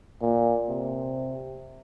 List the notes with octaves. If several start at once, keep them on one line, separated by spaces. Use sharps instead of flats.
A#2
C3